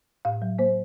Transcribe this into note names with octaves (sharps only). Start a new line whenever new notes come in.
A2 F5
F#3
A#3 C5